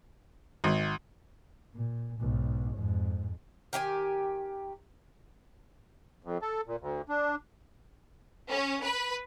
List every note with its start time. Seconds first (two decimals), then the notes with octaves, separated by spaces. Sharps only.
0.64 G#1
1.74 A#2
2.20 B1 G#2
2.77 F2 G#2
3.73 D#3 G4 D#5 G#5
6.23 F2
6.42 A4
6.67 A#2
6.81 D2
7.09 D4
8.50 C#4
8.82 B4